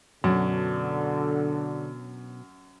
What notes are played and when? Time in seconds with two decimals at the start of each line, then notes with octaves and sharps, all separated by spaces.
0.24 F#2 B2 D3 F#3 D4